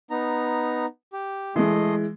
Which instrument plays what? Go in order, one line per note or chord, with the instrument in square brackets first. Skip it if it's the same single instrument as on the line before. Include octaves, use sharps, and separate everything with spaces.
[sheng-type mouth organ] B3 D#4 A#5
G4
[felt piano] E3 G#3 [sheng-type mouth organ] A3 D#5 C6